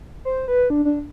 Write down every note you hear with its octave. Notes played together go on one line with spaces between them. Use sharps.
C5
B4
D4
D4